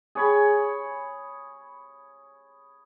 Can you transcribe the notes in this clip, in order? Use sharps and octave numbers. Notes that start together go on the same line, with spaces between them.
G#4 C#5 B5